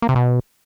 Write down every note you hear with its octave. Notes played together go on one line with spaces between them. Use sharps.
A#3
C3
B2